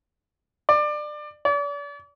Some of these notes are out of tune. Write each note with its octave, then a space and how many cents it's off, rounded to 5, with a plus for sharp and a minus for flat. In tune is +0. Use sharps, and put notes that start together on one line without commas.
D5 +25
D5 -40